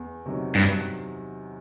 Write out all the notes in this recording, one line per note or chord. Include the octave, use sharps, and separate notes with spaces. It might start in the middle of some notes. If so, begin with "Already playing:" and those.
Already playing: E2
C3 D#3 F#3
G2